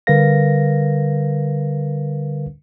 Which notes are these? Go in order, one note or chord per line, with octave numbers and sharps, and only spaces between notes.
D3 G3 A#4 B4 F5 A#6